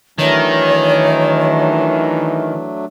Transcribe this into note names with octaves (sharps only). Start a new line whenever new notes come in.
D#3 E3 F#3 A3 D4 C#5